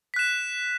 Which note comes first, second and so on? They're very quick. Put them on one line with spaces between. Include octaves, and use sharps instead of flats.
B6 F#6 E7